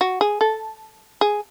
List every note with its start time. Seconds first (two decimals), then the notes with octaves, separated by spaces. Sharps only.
0.01 F#4
0.21 G#4
0.41 A4
1.21 G#4